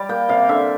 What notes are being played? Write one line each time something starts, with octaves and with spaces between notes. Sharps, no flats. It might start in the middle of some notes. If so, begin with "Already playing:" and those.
Already playing: G3 D5
A#3 G5
C3 F5
D3 E5